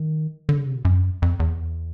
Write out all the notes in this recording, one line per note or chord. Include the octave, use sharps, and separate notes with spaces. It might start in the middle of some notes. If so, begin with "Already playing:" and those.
Already playing: D#3
D3
C#3
C3
B2
F#2
F2
E2